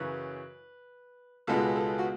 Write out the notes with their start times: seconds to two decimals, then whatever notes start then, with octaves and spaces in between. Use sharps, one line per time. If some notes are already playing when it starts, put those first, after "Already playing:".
Already playing: F#2 C#3 E3 B4
1.47 C#2 B2 G#3 B3 A4
1.76 A4
1.99 F#4